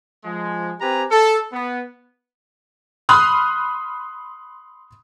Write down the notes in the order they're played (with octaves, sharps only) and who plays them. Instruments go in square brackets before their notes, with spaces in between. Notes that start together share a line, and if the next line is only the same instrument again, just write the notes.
[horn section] F3 G#3
C4 G4 B4 G#5 A#5
A4
B3
[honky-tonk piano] B5 C6 D#6 F6 F#6